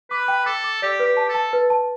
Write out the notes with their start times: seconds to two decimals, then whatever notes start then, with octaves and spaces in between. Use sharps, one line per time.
0.10 B4 D6
0.28 G5
0.46 A4 D6
0.64 D6
0.82 G4 D5
0.99 B4
1.05 G4
1.17 A5
1.29 A4
1.34 A5
1.53 B4
1.70 A5